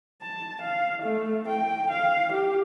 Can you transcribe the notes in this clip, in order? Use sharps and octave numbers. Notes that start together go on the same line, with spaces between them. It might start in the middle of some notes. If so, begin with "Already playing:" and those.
A5
F5
A3
G5
F5
G4